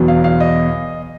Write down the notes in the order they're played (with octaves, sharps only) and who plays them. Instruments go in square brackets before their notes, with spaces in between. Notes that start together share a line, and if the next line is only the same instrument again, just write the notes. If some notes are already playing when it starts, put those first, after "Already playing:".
Already playing: [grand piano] E2 B2 F#3
F5
F5
D#5